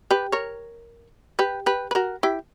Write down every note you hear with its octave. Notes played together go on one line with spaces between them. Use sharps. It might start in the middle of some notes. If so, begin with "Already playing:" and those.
G4 B4
A#4 C#5
G4 B4
G4 B4
B4
F#4 A#4
E4 G4